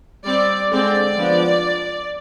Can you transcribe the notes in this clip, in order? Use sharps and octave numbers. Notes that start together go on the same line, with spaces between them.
G3 C4 D5
D3 G#3 C4 D5
F3 B3 D4